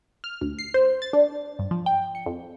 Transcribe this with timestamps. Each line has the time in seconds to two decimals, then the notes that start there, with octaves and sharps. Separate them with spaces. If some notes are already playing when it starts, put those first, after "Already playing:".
0.24 F6
0.41 D2
0.59 C7
0.74 C5
1.02 A6
1.13 D4
1.59 G2
1.71 F3
1.86 G5
2.15 C#7
2.26 F2